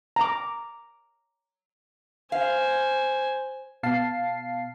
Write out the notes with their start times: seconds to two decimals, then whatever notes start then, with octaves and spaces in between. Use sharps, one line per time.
0.16 A#5 D6
2.32 C5 F5 G#5
3.83 B2 F5 A5 C7